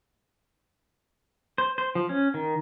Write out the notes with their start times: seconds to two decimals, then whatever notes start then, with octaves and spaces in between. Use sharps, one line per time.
1.58 C5
1.78 C5
1.95 F3
2.09 C#4
2.34 D#3